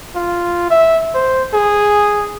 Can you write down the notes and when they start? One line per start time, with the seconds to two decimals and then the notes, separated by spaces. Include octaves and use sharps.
0.15 F4
0.70 E5
1.14 C5
1.53 G#4